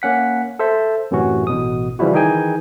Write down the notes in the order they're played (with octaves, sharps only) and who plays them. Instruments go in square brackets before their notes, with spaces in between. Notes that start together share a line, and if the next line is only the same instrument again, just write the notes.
[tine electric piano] A#3 C#4 F#5 B6
A4 C5 E5
F#2 A2 C3 E3 C#4 F#4
A1 B2 D#6
C#3 E3 F3 G3 E4 F#4
D#3 E3 D#4 G#4 G5 G#5